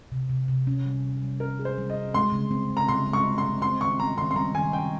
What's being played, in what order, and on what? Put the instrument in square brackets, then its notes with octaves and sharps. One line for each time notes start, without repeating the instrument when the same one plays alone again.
[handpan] C3
C3
C3
C#4
G3
G3
G3
[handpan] C#4 [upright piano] A#4
[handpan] G#4
[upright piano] C5
[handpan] G3
[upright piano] D#5
[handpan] G3
[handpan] G#3 [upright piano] C6
[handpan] C#3
C4
C#3
[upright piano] A#5
[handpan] C#3 [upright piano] C6
[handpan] G#3
[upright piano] C#6
[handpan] G#3
[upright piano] C6
[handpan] C4
[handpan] C4 [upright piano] C6
[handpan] D#3 [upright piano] C#6
[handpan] G3 [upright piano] A#5
[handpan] D#3 [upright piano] C6
[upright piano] C6
[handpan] G3 [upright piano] A#5
[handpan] D#3 [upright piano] G#5
[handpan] G3 [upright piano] G5